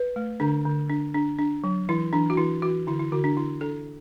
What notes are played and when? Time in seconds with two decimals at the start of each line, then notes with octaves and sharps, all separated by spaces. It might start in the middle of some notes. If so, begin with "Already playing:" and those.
Already playing: B4
0.16 A3
0.40 D3 D4
0.65 D3
0.89 D4
1.14 D4
1.39 D4
1.64 F#3
1.89 E3 E4
2.13 E3 D4
2.30 F#4
2.37 E3 E4
2.62 E3 F#4
2.87 D3 E4
2.99 E4
3.12 D3 F#4
3.24 D4
3.36 D3 E4
3.61 D4 A4